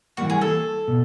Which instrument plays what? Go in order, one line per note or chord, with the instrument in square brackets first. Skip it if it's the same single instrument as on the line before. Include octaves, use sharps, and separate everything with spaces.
[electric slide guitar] E3 G3 A#3 [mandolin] F#4
[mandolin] G#4
A4
[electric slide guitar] B2